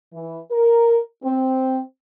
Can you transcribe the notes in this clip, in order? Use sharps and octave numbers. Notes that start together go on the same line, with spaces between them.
E3
A#4
C4